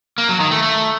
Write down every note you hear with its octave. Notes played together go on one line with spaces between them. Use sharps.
A#3
F#3
D#3
A3
A3